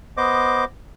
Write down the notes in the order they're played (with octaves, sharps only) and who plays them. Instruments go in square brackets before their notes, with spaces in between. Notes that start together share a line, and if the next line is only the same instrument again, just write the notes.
[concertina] B3 C5 D#5 D6